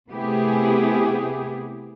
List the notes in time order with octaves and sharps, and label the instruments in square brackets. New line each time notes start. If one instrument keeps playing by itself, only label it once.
[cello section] C3 A3 B3 E4 G4 G#4